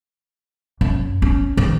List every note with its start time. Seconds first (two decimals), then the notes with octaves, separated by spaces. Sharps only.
0.81 F#2
1.22 C#4
1.57 D#3